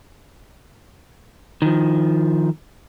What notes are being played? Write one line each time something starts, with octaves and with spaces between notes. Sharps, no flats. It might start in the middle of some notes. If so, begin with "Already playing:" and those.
D#3 F3